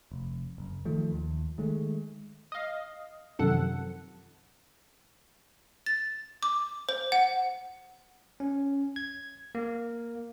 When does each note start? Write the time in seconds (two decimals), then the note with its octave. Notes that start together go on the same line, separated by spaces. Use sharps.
0.12 F1
0.58 F#1
0.85 D#3 F3 A3
1.12 D#2
1.58 D#3 G#3 A3
2.52 D#5 F5
3.39 F#2 C3 D#3 F3 A4 F#5
5.86 A6
6.43 D6
6.89 C5
7.12 F#5
8.40 C#4
8.96 G#6
9.55 A#3